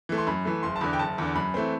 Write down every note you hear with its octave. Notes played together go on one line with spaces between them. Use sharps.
E3 A3
C6
F#2 B5
E3 A3
F#1 C6
A5
E2 D3 B5
G5
F#1 A5
E2 D3
F#2 B5
E3 A3 C4